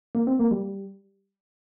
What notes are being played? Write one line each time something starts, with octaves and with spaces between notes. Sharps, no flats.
A#3
C4
A#3
G3